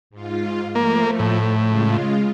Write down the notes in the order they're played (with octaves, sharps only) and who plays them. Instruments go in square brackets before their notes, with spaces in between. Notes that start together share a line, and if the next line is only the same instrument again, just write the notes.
[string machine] G#2 F4
[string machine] F3 A3 [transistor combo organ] A#3
[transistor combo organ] A2
[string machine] C#3 G#3 F4